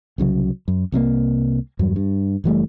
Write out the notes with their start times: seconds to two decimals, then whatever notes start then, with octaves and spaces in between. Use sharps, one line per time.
0.18 C2 C#3 F3 F#3
0.68 F#2
0.92 C2 C3 E3 A#3
1.79 E2 G2 F#3
1.96 G2
2.44 F#1 E3 G3 A3